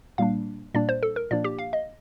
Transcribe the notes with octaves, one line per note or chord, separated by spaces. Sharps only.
A#2 G3 A#3 D4 F5
A#2 G3 A#3 D4 D5
C5
A4
A#4
A#2 F3 A#3 D4 D5
G4
F5
D#5